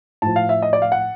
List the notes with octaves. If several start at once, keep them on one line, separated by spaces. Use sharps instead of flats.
A2 F3 A5
F5
E5
D#5
D5
F5
F#5